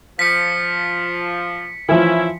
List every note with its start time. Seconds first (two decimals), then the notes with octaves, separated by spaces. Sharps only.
0.19 F3 B6 C#7
1.89 E3 F3 C#4 E4